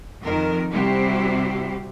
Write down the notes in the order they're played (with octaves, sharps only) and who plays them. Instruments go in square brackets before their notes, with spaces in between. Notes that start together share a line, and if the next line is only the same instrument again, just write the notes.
[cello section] F2 D#3 A#4
C3 G3 C4 E4 F#4 G4